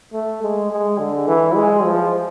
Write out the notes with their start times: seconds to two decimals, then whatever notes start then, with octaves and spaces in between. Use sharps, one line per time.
0.13 A3
0.43 G#3
0.71 G#3
0.99 D3
1.28 E3
1.55 G#3
1.84 F3